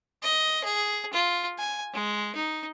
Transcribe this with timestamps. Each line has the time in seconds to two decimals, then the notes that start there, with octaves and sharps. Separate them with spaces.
0.23 D#5
0.64 G#4
1.13 F4
1.59 G#5
1.93 G#3
2.35 D#4